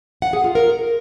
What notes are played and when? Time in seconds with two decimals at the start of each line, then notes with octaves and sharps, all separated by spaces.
0.22 F#5
0.33 G#4
0.44 F4
0.55 A#4